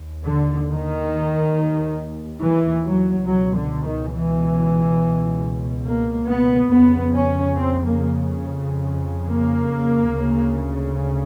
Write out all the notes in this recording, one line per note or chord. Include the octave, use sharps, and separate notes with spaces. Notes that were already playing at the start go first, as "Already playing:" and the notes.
Already playing: D#2
D3
D#3
E3
F#3
C#2 B2 F#3
D3
D#3
E3
A#3
B3
F2 C#3 B3
C#4
C4
A#3
A#3
D2 C#3